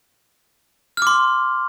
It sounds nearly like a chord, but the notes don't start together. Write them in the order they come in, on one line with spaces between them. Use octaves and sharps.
F6 D6 C6